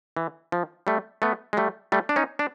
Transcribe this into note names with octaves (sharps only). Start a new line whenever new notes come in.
E3
F3
G3 A3
A3 B3
G#3
G3 A3
G3 A3
D4
C#4 D#4
D4